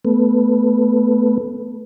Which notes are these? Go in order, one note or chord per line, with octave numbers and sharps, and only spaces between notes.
A3 B3